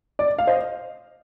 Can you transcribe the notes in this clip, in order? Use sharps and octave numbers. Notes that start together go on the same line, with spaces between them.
D5
F5
C5 D#5